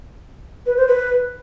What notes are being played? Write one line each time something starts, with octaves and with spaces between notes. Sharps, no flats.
B4
C5
B4